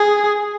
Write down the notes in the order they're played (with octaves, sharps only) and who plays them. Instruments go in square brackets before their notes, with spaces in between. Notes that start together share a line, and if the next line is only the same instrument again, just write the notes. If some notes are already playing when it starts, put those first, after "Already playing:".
Already playing: [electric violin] G#4